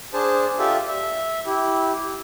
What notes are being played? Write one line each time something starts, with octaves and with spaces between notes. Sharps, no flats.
D4 G#4 C5 A5
F4 G4 A4 D5 E5
E5
E4 G4